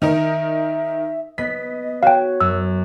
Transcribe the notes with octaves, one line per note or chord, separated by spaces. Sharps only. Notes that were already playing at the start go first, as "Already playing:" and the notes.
D#3 D#4 A#4 E5
B3 D#5 B6
F#4 C#5 F5 G5
F#2 E6